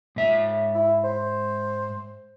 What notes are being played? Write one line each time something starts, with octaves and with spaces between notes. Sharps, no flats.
G#2 E5
E4
C5